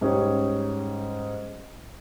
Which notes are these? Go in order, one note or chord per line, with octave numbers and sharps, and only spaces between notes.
G#2 G3 C#4 G#4